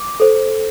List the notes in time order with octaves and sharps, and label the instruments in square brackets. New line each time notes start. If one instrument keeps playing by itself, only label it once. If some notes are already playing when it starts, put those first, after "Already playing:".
Already playing: [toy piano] D6
A4 C5